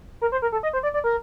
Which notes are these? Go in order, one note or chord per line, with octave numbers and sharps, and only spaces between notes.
A#4
C5
A#4
A4
D#5
C5
D5
D5
A#4